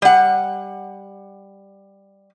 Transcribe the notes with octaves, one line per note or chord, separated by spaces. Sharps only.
G3 F#5